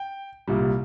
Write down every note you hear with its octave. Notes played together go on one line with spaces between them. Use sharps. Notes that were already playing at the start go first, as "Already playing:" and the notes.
Already playing: G5
C2 A#2 G3